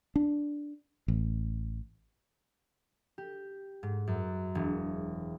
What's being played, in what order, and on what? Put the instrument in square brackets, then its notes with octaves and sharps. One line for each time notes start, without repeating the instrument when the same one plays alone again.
[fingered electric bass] D4
A1
[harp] G4
G#2
F#2
E1